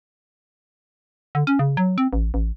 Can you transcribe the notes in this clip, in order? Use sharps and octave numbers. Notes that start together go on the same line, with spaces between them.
D3
C#4
C#3
F#3
C4
A1
A1